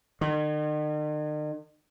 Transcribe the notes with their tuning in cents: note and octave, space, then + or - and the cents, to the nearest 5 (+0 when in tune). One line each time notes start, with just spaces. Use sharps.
D#3 -45